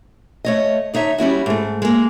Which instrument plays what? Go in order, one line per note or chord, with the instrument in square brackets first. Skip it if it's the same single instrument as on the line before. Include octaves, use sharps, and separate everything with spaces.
[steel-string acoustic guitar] A3 C#5 D#5
D3 D#4 C#5 E5
G3 C#4 E4 F#4
G#2 A3
G#3 A#3